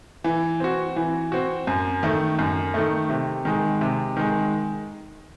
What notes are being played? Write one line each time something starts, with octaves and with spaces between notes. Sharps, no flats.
E3
C4 F#4
E3
C4 F#4
F#2
D#3 A3
F#2
D#3 A3
C3
D#3 G#3
C3
D#3 G#3